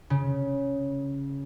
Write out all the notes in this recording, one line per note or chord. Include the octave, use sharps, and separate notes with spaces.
C#3